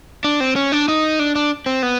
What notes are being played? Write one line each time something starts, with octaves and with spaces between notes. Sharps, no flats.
D4
C4
C#4
D4
D#4
D4
D4
C4
B3